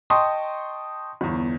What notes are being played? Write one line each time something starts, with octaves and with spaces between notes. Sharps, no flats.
D#5 G5 A5 C6 C#6 D#6
G1 E2